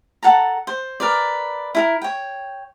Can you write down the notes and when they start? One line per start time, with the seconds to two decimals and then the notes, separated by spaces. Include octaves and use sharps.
0.23 A4 F#5 A5 A#5
0.67 C5
1.00 A#4 B4 D5
1.75 E4 A4 A#4
2.01 C#5 G5